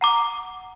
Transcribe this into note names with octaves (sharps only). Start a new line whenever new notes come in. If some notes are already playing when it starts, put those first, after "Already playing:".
F#5 A#5 D6